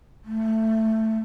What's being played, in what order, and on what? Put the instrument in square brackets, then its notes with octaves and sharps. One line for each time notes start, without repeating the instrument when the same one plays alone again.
[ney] A3